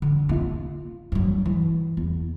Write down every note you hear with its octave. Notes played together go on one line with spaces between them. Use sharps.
D3
G2 F4
G2 F#3
E3
E2